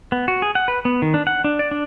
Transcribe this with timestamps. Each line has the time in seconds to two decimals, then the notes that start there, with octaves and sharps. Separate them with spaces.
0.12 B3
0.28 F#4
0.42 G#4
0.55 F#5
0.68 B4
0.85 B3
1.02 D#3
1.14 D4
1.27 F#5
1.44 D4
1.59 D5
1.71 D4